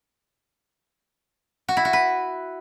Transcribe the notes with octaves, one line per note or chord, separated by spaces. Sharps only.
F#4
E4
F#4
B4